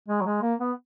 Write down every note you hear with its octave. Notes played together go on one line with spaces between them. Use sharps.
G#3
F#3
G#3
A#3
B3